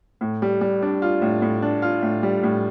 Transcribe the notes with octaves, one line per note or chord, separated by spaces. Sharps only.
A2
G3
G3
D4
F4
A2
A2
D4
F4
A2
G3
A2